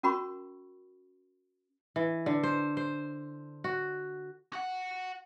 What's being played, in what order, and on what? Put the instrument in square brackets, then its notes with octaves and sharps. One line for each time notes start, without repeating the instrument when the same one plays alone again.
[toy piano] C#4 F#4 A#4 B5 C#6
[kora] E3
D3
C5
C5
F#4
[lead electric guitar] F#4 F#5